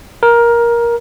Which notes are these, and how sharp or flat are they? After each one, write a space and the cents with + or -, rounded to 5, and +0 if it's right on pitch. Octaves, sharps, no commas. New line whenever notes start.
A#4 +15